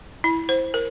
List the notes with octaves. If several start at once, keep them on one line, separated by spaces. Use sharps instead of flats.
E4
C5
A#4